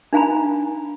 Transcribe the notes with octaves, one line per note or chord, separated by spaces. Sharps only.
D4 D#4 F5 G#5 A#5 B5